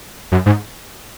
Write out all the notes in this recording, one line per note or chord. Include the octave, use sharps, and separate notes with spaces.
F#2
G#2